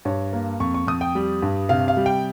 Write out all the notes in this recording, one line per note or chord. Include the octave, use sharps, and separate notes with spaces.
G2 C#5
A#3
F2 C#6
C#6
F2 D#6
G5
G3
G2
C3 F5
F5
G3
G5